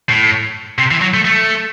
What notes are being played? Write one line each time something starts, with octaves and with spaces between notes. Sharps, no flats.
A2
C3
E3
F#3
A3
A3